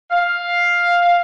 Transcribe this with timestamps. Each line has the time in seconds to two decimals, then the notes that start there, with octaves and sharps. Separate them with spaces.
0.10 F5